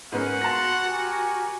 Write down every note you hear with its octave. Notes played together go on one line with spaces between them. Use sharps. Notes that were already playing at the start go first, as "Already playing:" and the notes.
G#2 B3 C#4 G#4 A#4 F#5
A#3 B3 F#4 A5 C6 A#6
G4 A#4 G#5